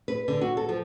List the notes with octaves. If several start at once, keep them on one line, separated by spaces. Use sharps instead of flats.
B4
D3
F#4
A4
F3